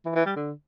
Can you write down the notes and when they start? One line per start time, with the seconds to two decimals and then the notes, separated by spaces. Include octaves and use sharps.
0.05 E3
0.16 E3
0.26 G3
0.36 D3